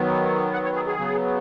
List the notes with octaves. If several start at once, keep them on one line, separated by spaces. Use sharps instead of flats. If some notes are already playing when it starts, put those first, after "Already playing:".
Already playing: D#3 F#3 B3
F#5
C#5
G#4
G#4
C#3 F#3 B3